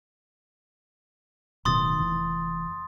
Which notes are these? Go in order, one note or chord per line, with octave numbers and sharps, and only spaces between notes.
D1 B2 D#3 C6 D#6 A6
F1 E3